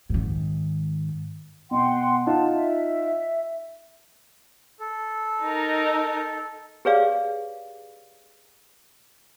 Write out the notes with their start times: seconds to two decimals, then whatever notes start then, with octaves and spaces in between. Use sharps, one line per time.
0.10 G#2 D#3
1.71 B2 F#5 G5 C6
2.27 D#4 F4 F#5 A5
2.54 E5
4.80 A4
5.43 D#4 A#4
6.85 G4 G#4 B4 C#5 D5 F5